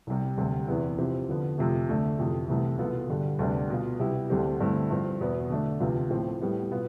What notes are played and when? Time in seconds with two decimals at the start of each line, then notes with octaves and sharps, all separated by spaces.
0.07 C2 C3 G3
0.37 D2 C3 G3
0.67 E2 C3 E3 B3 E4
0.98 C3 F3 C4 E4 G4
1.28 D3 F3 B3
1.58 F2 C3 F3 A3
1.89 D2 D3 A3 D4
2.19 F2 C3 E3
2.48 C2 C3 E3 A3
2.78 C2 B2 B3 F4 A4
3.09 G2 D3 G3
3.39 D2 C3 G3 B3 D4
3.70 B2 B3 F4
3.99 C3 G3 B3 E4 G4
4.30 D2 D3 G3 C4 G4
4.60 G2 D3 A3 C4 E4
4.90 G2 F3 C4
5.21 E2 B2 B3 E4
5.50 D3 A3 D4
5.80 D2 C3 F3 B3 F4
6.10 A2 F3 C4
6.41 A2 G3 B3
6.71 B2 B3 F4